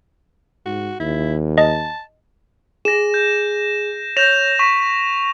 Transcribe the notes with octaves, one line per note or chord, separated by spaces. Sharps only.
G#2 F#4
D#2 E4
D#5 A5
G#4 A#6 E7
G6
C#5 G6 A#6 E7 F7
C#6 B6